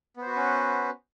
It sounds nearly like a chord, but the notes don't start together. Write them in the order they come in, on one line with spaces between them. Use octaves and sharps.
B3 C5 F#4 B4 C#4